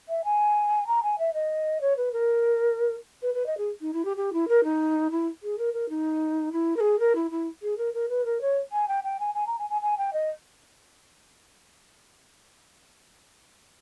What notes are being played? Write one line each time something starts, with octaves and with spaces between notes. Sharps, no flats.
E5
G#5
A#5
G#5
E5
D#5
C#5
B4
A#4
B4
B4
D#5
G#4
D#4
E4
G4
G4
E4
A#4
D#4
E4
G#4
A#4
A#4
D#4
E4
A#4
G#4
A#4
E4
E4
G#4
A#4
A#4
B4
A#4
C#5
G#5
G5
G5
G#5
G#5
A#5
G#5
G#5
G#5
G5
D#5